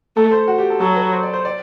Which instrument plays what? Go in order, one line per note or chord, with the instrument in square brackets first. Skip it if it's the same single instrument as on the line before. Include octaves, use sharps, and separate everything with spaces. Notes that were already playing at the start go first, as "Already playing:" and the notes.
[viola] A3 [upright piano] A4
[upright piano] C5
F#4
G4
A4
[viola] F#3 [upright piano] A4
[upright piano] B4
C5
D5
C5
D5